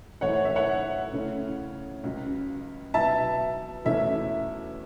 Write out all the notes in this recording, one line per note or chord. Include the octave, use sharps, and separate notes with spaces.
F#2 E3 A3 E4 C#5 F#5
C#5
E5
C#5 F#5
C#3 A3 C#4 E4
C#2 C#3 F#3
B2 F#3 B3 E5 A5
E2 B2 A3 C#4 E4 E5